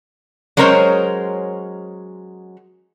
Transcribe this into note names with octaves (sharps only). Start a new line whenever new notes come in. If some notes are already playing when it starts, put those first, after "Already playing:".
F#3 G#3 C#4 A#4 C5 C#5